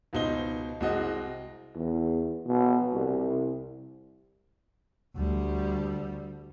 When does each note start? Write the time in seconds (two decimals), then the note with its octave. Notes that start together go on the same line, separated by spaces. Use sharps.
0.13 C#2 B2 D#4 C5 G7
0.80 C2 G#3 C4 F#4 D#5
1.76 E2
2.47 B2
2.92 C2
5.16 D2 G3